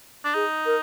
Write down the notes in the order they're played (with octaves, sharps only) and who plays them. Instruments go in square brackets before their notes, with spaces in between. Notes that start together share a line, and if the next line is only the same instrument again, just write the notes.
[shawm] D4
[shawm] D#4 [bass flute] G#4
[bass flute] A#4